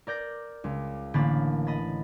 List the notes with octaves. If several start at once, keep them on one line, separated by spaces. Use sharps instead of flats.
A#4 D5 G6 A#6
C#2
A1 D3 A#3 A#4 B5 A6
D#5 B5 A6